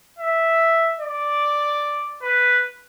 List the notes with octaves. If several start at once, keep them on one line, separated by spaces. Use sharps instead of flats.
E5
D5
B4